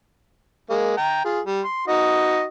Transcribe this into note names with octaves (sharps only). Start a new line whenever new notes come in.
G#3 A#3
G5 A#5
F4 G#4
G3
C6
D#4 F#4 D#5